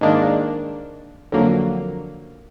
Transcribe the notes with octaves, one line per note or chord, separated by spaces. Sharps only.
G#2 D#3 A#3 D4
F2 D3 F#3 A#3